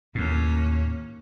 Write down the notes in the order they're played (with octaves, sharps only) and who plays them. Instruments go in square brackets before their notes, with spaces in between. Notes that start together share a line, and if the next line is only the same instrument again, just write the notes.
[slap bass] D#2 A2 [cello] A#3 C#4